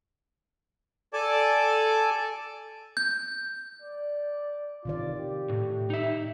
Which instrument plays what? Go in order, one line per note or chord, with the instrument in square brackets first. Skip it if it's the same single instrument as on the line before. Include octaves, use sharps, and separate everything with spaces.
[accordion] A4 D5 G#5 A5 D6
[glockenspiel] G6
[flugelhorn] D5
[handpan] C3 D#3 D5 [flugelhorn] F4
[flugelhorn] G4
[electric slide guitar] A2
D#4 E5